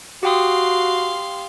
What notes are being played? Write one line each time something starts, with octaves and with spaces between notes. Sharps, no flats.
F#4 G4 F5 G5 C6 D#6